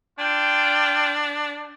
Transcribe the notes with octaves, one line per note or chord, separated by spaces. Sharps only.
D4 F4 G5